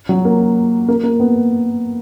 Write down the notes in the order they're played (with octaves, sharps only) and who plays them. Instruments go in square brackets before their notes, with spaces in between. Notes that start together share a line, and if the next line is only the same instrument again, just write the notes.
[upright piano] F#3
A#3
A#3
A#3
B3